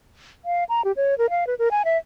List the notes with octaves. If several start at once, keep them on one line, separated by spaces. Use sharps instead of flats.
F5
A#5
G4
C#5
A#4
F5
B4
A#4
G#5
E5